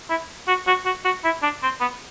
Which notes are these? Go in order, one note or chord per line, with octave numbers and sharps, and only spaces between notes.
E4
F#4
F#4
F#4
F#4
E4
D4
C4
B3